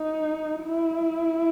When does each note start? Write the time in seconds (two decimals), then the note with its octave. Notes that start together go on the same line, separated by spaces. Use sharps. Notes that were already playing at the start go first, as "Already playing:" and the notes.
Already playing: D#4
0.63 E4